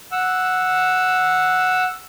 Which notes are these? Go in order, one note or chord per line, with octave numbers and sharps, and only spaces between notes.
F#5 E6